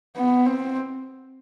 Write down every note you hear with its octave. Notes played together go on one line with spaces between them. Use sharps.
B3
C4